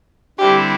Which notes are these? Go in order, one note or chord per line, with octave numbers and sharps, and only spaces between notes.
D3 G3 C4 E4 G4